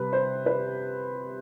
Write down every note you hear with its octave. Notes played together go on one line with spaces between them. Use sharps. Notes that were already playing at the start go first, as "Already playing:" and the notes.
Already playing: C3 G3 B4
C5
B4